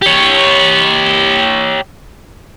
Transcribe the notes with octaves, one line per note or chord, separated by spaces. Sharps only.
G4 C#5